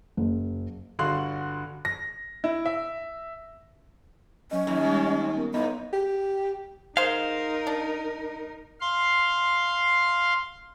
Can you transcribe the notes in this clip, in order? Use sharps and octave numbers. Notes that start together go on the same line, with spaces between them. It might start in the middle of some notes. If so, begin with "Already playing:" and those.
F#1
G1 D3 F#4 F5 C6 F#6
A#6
E4
E5
F#3 C#4 D#5
D#2 F#3
G3 G#3
D#5 F#5
B3 C#4 A#4
A2 B3 D#4 D#5 B5
G4
G#3 D#4 A#4 C5 F5
D4
F5 C6